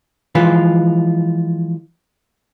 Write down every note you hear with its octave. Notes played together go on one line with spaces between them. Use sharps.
E3 F3 G#3 F4 B4